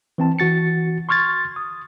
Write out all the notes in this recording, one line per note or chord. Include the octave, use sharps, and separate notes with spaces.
E3 C4 A5
E3 F#4 A6 C#7
C6 C#6 F6 G#6 A6
D#6